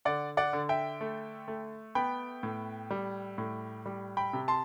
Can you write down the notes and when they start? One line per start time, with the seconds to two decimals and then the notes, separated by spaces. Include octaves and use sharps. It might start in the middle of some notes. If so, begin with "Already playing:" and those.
0.05 D3 D5 F#5
0.37 D5 F#5
0.53 D3
0.69 E5 G5
1.01 A3
1.48 A3
1.95 B3 G5 B5
2.43 A2
2.91 G3
3.38 A2
3.86 G3
4.17 G5 B5
4.33 C3
4.48 A5 C6